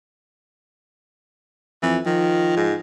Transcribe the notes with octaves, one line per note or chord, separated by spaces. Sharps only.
F2 E3
D#3 F3
G#2